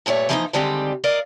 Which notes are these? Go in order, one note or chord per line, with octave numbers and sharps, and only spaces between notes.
G2 A#2 A3 F4 C#5
E3 F3 G3 A3 A#3 D#4
D3 D#3 G3 G#3 C4 G4
A#4 D5 D#5 F5